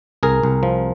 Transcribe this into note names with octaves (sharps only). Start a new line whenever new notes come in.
C2 G#4 A#4
C2
F3